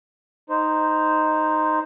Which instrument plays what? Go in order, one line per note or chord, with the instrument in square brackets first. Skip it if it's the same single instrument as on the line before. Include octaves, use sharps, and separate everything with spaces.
[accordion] D#4 C5